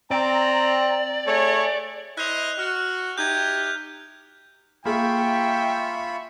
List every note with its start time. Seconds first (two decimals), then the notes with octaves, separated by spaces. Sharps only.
0.11 C4 D5 A#5
1.27 A3 G#4 C#5
2.17 E4 C5 D#5 F#6 F7
2.59 F#4 F6
3.18 D#4 E4 G4 G6 G#6
4.86 A#3 F4 G#4 E5 G5 B5 C#6